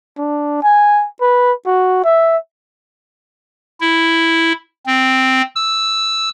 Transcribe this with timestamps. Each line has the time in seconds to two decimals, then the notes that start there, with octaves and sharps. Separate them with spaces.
0.17 D4
0.63 G#5
1.21 B4
1.66 F#4
2.04 E5
3.81 E4
4.86 C4
5.56 E6